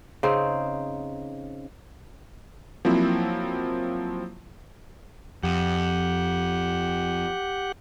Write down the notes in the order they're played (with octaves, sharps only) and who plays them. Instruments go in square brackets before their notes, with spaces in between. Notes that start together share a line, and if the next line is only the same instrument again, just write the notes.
[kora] C#3 C4 D#4 C5
[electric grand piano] F3 F#3 A#3 C4 E4
[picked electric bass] F2 [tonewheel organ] G4 F#5